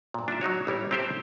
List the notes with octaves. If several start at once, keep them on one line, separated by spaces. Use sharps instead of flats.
G2 A#2
D4 E4 F4 E5
F#3 D#4 F#4 C#5
A1 G3 E4 C#5
C4 E4 G4 A4 C5 E5